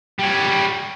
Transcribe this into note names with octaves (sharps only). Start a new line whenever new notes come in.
G3 C#5